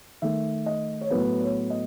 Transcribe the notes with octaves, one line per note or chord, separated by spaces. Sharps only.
D#3 A3 E5
D#5
C#5
A2 F#3 B3 B4
C#5
D#5